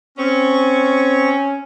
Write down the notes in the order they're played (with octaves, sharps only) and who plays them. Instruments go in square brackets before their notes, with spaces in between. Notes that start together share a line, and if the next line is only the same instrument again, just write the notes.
[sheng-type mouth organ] C4 C#6 [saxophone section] C#4